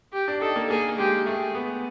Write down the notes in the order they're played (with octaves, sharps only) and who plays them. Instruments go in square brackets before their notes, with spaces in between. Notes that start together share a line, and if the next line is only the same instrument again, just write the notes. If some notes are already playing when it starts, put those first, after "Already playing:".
[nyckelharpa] G4
[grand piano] D4
[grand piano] D#4 [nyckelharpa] A4
[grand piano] A#3
[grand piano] A#3 [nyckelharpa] G#4
[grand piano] G#3 [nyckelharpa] G4
[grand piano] A3 [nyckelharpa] G#4
[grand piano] B3